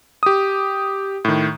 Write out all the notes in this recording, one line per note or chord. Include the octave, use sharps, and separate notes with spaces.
G4 D#6
A2 D#3